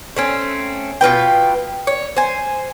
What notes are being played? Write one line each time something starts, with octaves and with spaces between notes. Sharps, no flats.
A3 C4 C#4
B2 F4 B4 G5
C#5
C5 G#5